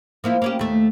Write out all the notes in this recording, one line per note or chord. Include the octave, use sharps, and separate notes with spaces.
F3 A#3 E4
A#3 C#4 G4
D#2 A3